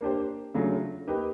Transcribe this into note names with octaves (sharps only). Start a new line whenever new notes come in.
A#3 D4 G4 C5
C#3 F#3 A3 D4 F4
A#3 D#4 G4 B4